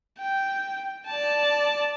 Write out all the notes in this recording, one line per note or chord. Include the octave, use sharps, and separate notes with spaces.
G5
D5 A5